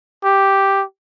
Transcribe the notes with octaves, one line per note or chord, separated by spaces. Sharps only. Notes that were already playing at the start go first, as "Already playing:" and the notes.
G4